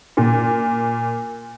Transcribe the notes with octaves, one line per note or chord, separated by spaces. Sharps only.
A#2